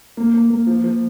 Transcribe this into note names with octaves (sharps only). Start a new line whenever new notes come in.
A#3
A#3
A#3
F3
F3